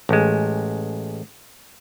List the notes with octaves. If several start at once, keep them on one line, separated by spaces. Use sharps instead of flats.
A1 G#3